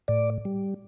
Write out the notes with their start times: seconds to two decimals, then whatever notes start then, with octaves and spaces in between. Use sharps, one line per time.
0.08 A2 D5
0.45 G3